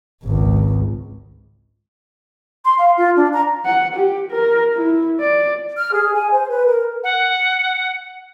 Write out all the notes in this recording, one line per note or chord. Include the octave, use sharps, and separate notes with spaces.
G#1 C#2
C6
F5
F4
D4
A#5
F#5
G4
A#4
E4
D5
F6
G#4
G#5
C5
B4
A#4
F#5